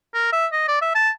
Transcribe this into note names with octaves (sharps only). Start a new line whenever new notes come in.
A#4
E5
D#5
D5
E5
A5